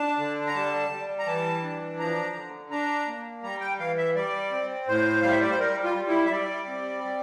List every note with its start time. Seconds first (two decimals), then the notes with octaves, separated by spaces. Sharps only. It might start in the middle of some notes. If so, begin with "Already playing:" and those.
Already playing: D4 A5
0.18 D3
0.47 A#5
0.55 G3 A5
0.91 G3
1.19 A#5
1.26 E3 A5
1.63 D4
1.99 F3 A#5
2.35 D3
2.71 D4 A#5
3.07 A#3
3.43 G3 A#5
3.61 G5
3.79 E3 F5
3.98 E5
4.16 G3 D5
4.51 C4
4.87 A2 C5
5.22 G3 F5
5.31 E5
5.41 D5
5.50 C5
5.60 G3 A#4
5.84 F4
5.96 G3
6.08 E4
6.25 E5
6.31 G3 D5
6.67 C4
7.04 G3